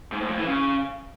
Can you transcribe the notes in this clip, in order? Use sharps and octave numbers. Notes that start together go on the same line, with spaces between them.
G#2
A2
F2
E3
C#3